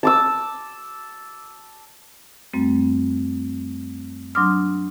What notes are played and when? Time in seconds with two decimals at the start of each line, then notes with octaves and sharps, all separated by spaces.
0.03 A5 D6 E6
2.53 F#2 G3 A3 C4
4.35 F#3 D4 C6 D6 D#6 F6